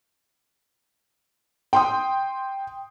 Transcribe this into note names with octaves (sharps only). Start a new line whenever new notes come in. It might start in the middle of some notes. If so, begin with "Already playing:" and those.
G5 C6 D#6